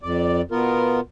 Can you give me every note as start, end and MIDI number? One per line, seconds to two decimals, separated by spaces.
0.03 0.42 41
0.03 0.42 74
0.51 1.00 47
0.51 1.00 59
0.51 1.00 65
0.51 1.00 70